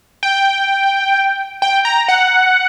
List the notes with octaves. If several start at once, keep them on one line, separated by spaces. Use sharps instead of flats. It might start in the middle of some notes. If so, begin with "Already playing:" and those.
G5
G5
A#5
F#5